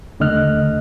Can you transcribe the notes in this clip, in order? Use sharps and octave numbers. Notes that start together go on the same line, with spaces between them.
D#2 D3 A3 D#5 F6 F#6